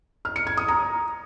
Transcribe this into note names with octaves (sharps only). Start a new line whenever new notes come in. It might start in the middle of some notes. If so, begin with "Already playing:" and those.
F6
C#7
G#6
D#6
A#5